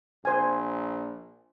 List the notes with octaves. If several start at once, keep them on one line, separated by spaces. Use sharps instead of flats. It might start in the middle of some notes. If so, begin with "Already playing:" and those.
A#1 C5 G#5